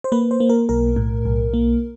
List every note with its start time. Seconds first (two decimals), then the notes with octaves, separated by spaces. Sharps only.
0.04 C5
0.12 A#3 B4
0.31 C5
0.40 A#3
0.49 A#4
0.69 B1 A#4
0.96 A2
1.25 B1
1.54 A#3